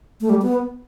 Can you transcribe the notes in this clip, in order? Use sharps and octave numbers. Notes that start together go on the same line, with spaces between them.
A3
G3
B3